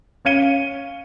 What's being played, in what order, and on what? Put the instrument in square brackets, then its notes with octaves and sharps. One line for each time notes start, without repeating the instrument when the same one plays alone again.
[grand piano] C#4 F5 G#6 C#7 D#7 G7